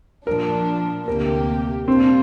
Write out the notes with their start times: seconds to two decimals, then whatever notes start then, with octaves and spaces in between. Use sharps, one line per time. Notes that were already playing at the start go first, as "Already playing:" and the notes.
0.27 A#2 F3 D4 A#4
1.07 D2 C3 A#3 G4 A#4
1.88 A#2 G3 A#3 C4 D4 F4